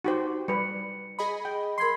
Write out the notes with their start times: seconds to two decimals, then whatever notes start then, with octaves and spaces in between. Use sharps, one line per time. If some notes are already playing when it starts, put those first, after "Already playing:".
0.05 D#4 F#4 G4 C5
0.48 G3 B4 C#7
1.19 G#4 D#5 B5
1.45 G5
1.78 A#4 B5 C6 G#6 C7